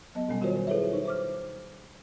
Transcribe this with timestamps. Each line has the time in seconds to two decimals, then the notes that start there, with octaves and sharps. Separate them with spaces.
0.15 F#3 B3 D#5
0.28 B2 G3 C#4 G#5
0.41 D#3 F4 F#4 A#4 C5 C#5
0.67 E4 G#4 A4 B4 C#5 E5
0.93 D#4 C5
1.05 C5 D6 F6